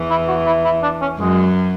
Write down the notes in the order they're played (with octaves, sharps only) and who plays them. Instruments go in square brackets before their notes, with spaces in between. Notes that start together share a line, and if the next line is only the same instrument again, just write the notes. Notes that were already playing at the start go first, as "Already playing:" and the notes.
Already playing: [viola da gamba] E2 E3
[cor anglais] E4
F#4
E4
E4
D4
C#4
[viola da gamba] F#2 F#3 [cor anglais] G#3